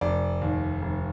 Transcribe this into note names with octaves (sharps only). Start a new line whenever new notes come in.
F1 D5
D#2
F1